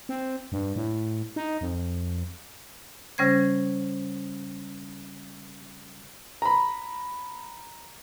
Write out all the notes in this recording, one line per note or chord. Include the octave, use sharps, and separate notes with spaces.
C4
G2
A2
D#4
F2
C#3 G3 C#4 C5 G#6
A#5 B5